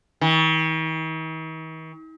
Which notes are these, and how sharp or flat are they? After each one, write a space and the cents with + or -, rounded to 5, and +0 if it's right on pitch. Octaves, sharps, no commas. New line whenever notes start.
D#3 +45